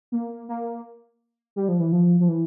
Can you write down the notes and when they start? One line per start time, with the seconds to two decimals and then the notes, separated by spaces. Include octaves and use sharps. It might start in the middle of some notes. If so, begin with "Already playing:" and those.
0.12 A#3
0.49 A#3
1.56 G3
1.68 F3
1.80 E3
1.92 F3
2.20 F3
2.28 E3